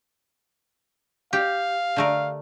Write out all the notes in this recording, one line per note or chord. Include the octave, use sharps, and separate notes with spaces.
G4 F5
D3 A3 A#4